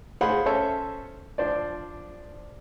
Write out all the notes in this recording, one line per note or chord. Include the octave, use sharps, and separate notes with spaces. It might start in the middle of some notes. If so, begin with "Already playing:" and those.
F4 G#4 C5 F#5 B5
C#4 A4 C5 C#5 E5
F3 D4 C5 D5